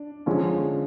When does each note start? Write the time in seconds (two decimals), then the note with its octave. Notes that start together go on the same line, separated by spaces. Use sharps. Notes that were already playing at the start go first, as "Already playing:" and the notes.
Already playing: D4
0.26 D3 F3 G#3 C#4